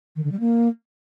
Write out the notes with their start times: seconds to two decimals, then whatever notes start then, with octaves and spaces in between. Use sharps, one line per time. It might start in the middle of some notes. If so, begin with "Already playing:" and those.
0.16 D#3
0.24 D3
0.32 G3
0.40 A#3